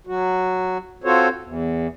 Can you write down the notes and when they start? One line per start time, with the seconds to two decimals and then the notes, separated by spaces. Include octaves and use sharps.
0.07 F#3 F#4
1.04 C4 F4 F#4 A4 C5 C#5
1.44 E2